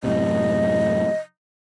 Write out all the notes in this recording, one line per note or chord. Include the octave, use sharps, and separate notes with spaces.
F#2 A2 C3 D#5